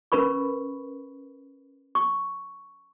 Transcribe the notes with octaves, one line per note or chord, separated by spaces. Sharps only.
C#4 A#4 B4 B5 C#6
C#6